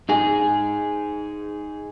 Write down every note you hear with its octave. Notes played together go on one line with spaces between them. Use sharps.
D#4 G#4